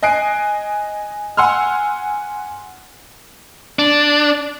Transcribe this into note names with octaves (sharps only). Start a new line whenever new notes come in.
D#5 G#5 F#6 C7 D7
F#5 G#5 C6 E6 F6
D4